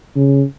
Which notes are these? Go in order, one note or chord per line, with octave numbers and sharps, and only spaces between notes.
C#3